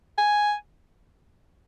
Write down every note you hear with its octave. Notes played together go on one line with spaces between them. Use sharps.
G#5